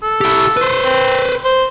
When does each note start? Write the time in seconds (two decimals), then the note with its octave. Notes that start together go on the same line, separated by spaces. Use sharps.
0.03 A4
0.21 E4 G4
0.57 B4 C5
0.84 C4
1.44 C5